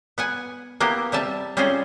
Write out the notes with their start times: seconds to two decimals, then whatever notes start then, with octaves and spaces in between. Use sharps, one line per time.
0.18 B3 F#5 G#5
0.80 A#3 B3 E4 G4
1.12 C3 G3 E5 A5
1.57 G3 C4 C#4 F4 G#4 C5